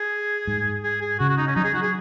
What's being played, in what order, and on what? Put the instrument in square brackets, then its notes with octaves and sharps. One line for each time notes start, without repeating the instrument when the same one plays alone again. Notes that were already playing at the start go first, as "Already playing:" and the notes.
Already playing: [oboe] G#4
[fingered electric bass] G#2
[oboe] G#4
G#4
[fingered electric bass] C#3 [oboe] F#4
[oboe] F#4
D#4
C#4
[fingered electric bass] F#3 [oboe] D#4
[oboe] G#4
F#4
G#4